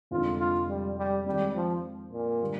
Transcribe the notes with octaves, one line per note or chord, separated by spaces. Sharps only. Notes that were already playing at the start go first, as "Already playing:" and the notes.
F1 F2 D3 G#3 D#4 F4
F4
G3
G3
F2 D#3 G3 G#3
F3
A#2
D3 G3 A#3